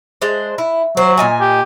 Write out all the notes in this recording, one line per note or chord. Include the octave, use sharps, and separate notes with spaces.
G#3 D4 C5
E4
F#3 C5
A#2 D#5 G#5
G4